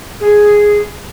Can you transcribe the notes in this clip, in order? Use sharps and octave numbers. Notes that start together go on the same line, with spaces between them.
G#4